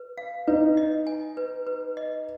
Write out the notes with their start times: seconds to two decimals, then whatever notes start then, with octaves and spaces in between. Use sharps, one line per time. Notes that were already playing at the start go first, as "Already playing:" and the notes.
Already playing: B4
0.18 F5
0.47 D#4 B4
0.77 D#5
1.07 G#5
1.37 B4
1.67 B4
1.97 D#5